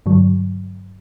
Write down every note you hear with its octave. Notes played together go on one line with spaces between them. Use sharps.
G2 D3 F#3